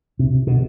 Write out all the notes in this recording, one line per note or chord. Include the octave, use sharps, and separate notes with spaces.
C3
B2